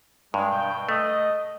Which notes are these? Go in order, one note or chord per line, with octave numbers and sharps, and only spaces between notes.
G2 G#3
B2 G5
A3 D#5